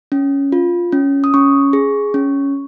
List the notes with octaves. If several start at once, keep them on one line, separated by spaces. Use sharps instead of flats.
C#4
F4
C#4
D#6
C#4 C#6
G#4
C#4